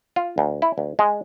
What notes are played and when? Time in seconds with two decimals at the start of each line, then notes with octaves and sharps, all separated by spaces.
0.16 F4
0.38 D2
0.62 E4
0.78 D2
0.99 G#3